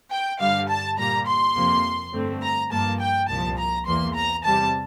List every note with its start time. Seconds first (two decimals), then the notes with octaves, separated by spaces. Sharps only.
0.12 G5
0.40 G2 D3 G3 F5
0.69 A5
0.98 A#2 G3 A#3 A#5
1.27 C6
1.55 F2 C3 F3 A#3
2.14 G2 D3 A3 C4
2.42 A#5
2.71 G2 F3 A#3 A5
3.00 G5
3.28 C2 A#2 F3 A5
3.58 A#5
3.86 E2 E3 A#3 C6
4.15 A#5
4.44 E2 C3 G3 A5